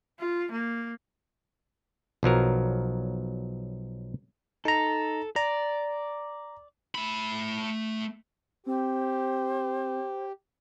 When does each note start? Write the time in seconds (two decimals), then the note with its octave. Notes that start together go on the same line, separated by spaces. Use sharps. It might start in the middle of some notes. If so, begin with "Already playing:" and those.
0.19 F4
0.52 A#3
2.23 B1 F3 F#3 A#4
4.65 D#4 A4 A#5
5.36 D5 A#5
6.95 A3 B5
8.66 C4 G4 C5